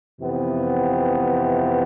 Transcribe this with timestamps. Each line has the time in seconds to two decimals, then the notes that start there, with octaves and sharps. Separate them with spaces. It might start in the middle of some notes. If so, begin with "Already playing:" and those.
0.21 F2 C3 E3 B3